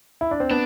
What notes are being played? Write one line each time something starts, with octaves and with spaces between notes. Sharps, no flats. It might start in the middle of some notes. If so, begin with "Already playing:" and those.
E4
D4
C4
B3 D4